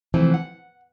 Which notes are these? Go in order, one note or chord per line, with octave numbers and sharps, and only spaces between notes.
C3 E3 F3 A3 C4
F#5